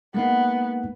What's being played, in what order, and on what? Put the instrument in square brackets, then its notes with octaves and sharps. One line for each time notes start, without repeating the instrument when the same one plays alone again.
[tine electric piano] G#3 A#3 D#4 [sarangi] B3